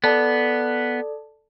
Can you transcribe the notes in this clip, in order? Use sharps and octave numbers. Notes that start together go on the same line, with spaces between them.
B3 A4 D5 A5